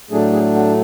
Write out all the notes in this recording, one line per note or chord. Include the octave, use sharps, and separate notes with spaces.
A2 F#3 A3 D4 G#4
G#4
F#4